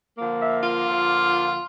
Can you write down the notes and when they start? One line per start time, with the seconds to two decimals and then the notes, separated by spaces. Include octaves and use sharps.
0.18 D3 F3 A#3
0.41 E5
0.63 F4
0.86 D3 F3 A#3